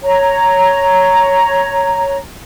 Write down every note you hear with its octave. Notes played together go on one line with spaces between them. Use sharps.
C#5 A#5